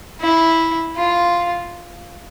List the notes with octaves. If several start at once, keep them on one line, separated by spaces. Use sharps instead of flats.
E4
F4